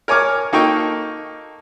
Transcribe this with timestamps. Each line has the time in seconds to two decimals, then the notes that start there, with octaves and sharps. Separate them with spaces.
0.08 A#4 C#5 G#5 D6 F6
0.53 A#3 D#4 A4 D#5 G5 C#6